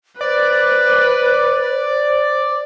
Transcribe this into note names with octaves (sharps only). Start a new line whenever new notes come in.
B4 C5 D5